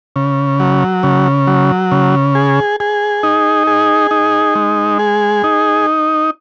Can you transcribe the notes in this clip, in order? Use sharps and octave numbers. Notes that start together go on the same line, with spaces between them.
C#3
F#3
C#3
F#3
C#3
G#4
G#4
D#4
G#4
D#4
G#3
G#4
D#4